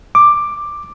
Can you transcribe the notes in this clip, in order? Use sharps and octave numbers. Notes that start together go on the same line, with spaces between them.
D6